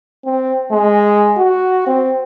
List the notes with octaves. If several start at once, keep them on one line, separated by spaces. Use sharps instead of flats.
C4
G#3
F#4
C4